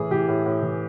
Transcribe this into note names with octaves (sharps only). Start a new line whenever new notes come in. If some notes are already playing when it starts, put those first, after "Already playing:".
Already playing: A2 E3 G#4
E3 G4
A2
A2
E3